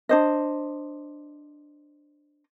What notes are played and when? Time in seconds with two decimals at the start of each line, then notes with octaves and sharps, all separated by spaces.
0.09 D4 C5 D#5